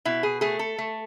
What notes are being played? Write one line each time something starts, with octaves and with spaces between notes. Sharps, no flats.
B2 E4
G#4
A3 G#4
A4
A3